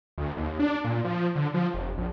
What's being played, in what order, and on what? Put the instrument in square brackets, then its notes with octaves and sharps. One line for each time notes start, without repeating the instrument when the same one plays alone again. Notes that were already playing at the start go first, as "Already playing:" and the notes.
[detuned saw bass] D2
D#2
D4
A#2
F3
D3
F3
F1
A#1